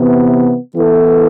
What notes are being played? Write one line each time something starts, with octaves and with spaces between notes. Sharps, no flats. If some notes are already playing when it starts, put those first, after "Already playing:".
Already playing: C3 E3 B3
E3 B3 E4 A4